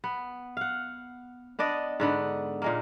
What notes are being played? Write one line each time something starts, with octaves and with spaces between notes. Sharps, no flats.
B3
F5 F#5
B3 D4 D5 D#5
G#2 D3 B3
A#2 G#3 A#3